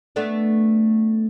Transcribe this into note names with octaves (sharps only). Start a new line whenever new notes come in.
A3 B3 D4